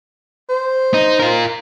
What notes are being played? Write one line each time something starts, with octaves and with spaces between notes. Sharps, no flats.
C5
D#4
F4 A#4